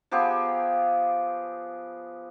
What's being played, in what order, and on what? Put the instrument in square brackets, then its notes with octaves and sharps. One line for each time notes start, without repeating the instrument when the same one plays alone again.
[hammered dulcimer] F3 B3 G4 G#4